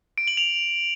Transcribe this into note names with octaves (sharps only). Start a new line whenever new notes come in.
D7
F#7
F7